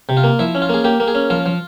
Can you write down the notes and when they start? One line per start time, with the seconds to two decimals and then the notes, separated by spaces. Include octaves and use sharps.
0.09 C3
0.17 F4
0.24 A#3
0.39 F3 E4
0.55 C#4
0.62 F4
0.69 A#3 G#4
0.84 A#3 G4
1.00 A#3
1.08 G#4
1.15 C#4
1.30 F3 F4
1.46 F3